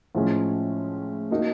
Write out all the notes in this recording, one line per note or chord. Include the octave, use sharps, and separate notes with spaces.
A2 F3 G#3 C#4
A#3 D#4 F#4